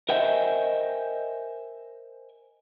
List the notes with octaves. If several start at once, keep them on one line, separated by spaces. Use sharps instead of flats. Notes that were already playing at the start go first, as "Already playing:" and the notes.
A#4 C5 D#5 E5 G5 G#5